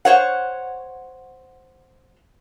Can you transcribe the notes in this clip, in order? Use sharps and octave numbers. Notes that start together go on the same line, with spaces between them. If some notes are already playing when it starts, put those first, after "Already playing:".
C5 C#5 F#5